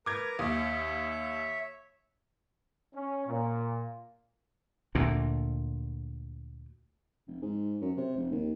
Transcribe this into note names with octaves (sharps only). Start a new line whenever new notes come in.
A#4 B4 A#5 D6 G#6
D#2 C#5 E5 D#6
C#4
A#2
D2 A#2
F1
G#2
F#2
C3
F1
D#2